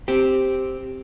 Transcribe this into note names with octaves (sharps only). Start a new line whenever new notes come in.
C4 G4